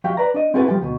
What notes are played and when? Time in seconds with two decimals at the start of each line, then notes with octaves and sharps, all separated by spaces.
0.04 F3 F#4 G4 E5 F5 G5
0.17 B4 D5 A#5
0.34 D4 D#5
0.54 C4 E4 F#4 G#4 A4 B4
0.67 F3 G3 A3 G4 A4
0.81 D2 B2